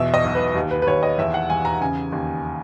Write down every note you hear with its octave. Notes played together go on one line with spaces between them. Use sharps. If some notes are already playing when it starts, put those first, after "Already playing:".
Already playing: E2 B2 E5
D#5
B1
B4
D#2
B4
B4
D#2 C#5
D#5
E2 E5
F#5
E2 G#5
A#5
C#3 G#5
D#2